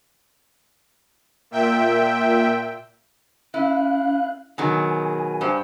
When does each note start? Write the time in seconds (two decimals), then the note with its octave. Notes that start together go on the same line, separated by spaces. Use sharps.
1.51 A#2 E5 G5
3.54 C#4 E4 F5 F#6
4.58 B2 D#3 F#3 G#4 G#5
5.41 G2 G4 C5